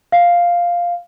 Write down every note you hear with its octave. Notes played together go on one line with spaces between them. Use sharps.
F5